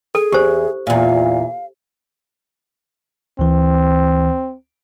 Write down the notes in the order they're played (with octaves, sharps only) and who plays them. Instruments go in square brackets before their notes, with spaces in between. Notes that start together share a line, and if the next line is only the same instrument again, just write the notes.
[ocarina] G#4 [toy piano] A4
[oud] E2 [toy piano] G4 C5
[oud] E2 A#2 [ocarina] F5
[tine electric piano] D2 E3 [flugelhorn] C4